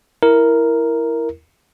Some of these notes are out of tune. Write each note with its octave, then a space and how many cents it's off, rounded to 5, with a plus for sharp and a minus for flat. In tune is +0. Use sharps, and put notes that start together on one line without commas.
E4 +0 A#4 +0